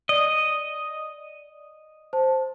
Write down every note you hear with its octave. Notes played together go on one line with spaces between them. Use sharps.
D5 D#5
C5 A5